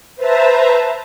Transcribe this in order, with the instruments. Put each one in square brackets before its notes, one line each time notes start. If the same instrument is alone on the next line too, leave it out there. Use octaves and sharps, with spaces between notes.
[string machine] B4 C5 E5 A5 A#5